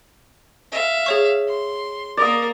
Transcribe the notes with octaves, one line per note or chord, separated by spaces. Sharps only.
E5 F5
G#4 C#5 C#6
C6
A#3 A#4 D5 D#6